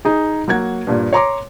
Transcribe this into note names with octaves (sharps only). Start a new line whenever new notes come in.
D#4 G#4
F#3 A#3 F#5 G#6
G2 A#2
C#5 A#5 C6 D6